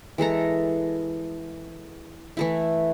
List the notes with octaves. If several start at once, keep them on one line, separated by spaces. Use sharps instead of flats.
E3 G#3 A4 A#5
E3 A3 E4